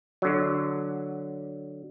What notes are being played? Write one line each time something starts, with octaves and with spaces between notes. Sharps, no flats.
D3 F#3